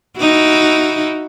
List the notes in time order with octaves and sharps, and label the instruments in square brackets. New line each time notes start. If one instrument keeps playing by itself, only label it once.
[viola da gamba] D#4 E4 F#4